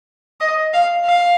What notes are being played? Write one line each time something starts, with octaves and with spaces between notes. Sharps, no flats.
D#5
F5
F5